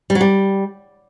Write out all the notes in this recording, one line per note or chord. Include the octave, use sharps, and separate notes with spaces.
G3
F#3
G3